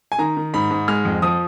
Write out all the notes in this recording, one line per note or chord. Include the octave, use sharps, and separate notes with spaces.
G#5
D#3 A#5
D#3
G#2 B5
G#2
G#3 F6
F2
F3 D#6